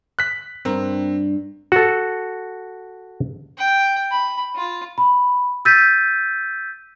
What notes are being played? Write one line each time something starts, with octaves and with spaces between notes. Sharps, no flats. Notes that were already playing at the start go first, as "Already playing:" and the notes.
F#6 B6
G2 C4 A#4
F#4 A4
G5
B5
F4
B5
E6 G6 A6 B6 D#7